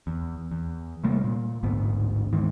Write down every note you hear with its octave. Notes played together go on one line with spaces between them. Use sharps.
E2
E2
C3 G3 A3 A#3
A#2
A1 D2 G#2 B3
G#2 D#3 E3